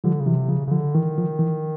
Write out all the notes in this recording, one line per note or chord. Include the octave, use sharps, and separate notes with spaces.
D3 F3 G3
C#3
C3 E3 F#3
C#3 F3
C#3
D3 F3
D#3 E3
F3
E3